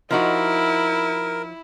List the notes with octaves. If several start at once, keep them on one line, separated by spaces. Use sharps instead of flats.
F3 D#4 E4 F#4 A#4